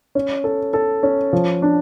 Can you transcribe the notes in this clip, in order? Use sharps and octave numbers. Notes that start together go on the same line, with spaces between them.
C#4
A4
A4
C#4
F3
D4